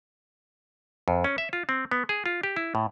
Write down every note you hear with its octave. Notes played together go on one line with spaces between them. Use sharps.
F2
C#4
E5
F4
C4
B3
G#4
F4
G4
E4
A2